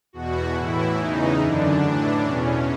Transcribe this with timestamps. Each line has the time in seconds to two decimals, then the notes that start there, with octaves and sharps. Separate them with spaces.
0.13 E2 B2 F#4
0.55 A2 E3 E4
0.97 E2 C#3 E3 D#4
1.39 F#2 D3 D4
1.81 A2 E3 D4
2.22 E2 B2 C#4